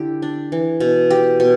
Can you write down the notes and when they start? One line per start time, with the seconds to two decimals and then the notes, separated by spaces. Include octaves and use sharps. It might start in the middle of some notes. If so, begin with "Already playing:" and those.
Already playing: D3 E4 G4
0.22 D4
0.52 E3
0.80 B2
1.10 G4
1.40 B2